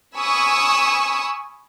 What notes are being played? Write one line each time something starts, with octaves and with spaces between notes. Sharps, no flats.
G#5 B5 C#6 D#6 E6